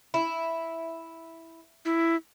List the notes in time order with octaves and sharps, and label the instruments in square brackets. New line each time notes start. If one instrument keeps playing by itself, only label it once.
[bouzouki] E4
[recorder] E4